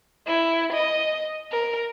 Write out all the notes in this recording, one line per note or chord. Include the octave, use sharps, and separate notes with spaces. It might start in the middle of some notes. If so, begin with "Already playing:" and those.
E4
D#5
A#4